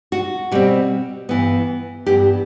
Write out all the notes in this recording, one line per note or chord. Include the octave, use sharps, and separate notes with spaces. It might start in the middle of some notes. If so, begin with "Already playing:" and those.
F#4
B2 G3 C4
G2 E3 B3
G2 E3 B3 G4